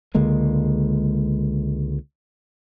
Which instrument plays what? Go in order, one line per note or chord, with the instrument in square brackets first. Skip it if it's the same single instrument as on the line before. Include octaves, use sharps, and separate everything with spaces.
[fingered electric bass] C#2 D3 G#3 A#3